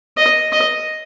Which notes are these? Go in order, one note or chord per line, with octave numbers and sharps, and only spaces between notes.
D#5
D#5